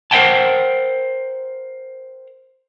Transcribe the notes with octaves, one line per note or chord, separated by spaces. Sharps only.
A#4 C5 E5 F#5 G5 A5